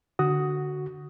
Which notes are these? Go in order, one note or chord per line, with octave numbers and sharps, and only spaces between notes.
D3 F#4 D#6